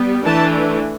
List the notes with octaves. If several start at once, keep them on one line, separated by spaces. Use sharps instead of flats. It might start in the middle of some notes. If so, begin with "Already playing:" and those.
Already playing: G3 B3
E3 A3 D4 A5